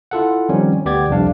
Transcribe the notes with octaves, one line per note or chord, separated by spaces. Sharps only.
E4 F4 A4 F#5
D#3 F3 G3 C4 C#4 D#4
D2 B3 G4 D5 D6 G#6
C2 F2 C3 D4 F5